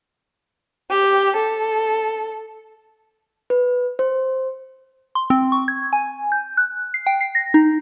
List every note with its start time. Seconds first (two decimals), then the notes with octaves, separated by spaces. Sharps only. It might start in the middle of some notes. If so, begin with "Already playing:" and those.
0.89 G4
1.35 A4
3.50 B4
3.99 C5
5.15 C6
5.30 C4
5.52 C#6
5.68 G#6
5.93 G#5
6.32 G6
6.57 F#6
6.94 C7
7.07 G5
7.21 C7
7.35 A#6
7.54 D#4